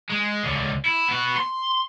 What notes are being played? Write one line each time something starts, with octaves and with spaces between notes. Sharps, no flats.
G#3
C#2 D3
E4
B3 F#4
C6